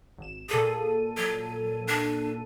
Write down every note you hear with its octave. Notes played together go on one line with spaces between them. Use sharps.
G#1 E7
A#2 G#4 A4 D#7
F#3
D4